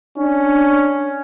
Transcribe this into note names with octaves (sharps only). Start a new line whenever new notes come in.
C#4 D4